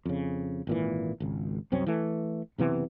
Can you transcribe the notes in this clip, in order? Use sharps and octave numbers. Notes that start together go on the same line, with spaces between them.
F2 C#3
G#1 A#2 E3
G#1 C#2
C2 F#2 C4 C#4
E3 A3
F#1 C3 E3 B3